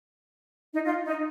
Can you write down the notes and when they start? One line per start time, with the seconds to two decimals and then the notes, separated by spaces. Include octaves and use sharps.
0.73 D#4
0.85 F4
1.06 D#4